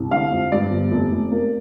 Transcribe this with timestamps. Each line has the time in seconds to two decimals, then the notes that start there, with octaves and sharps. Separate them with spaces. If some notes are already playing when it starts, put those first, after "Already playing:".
Already playing: C2
0.11 D3 F5
0.31 F2
0.52 G2 D5
0.71 G1
0.92 F1
1.12 F1
1.32 A#3